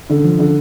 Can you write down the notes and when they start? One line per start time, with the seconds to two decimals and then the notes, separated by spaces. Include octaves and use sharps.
0.10 D3
0.24 F3
0.39 D3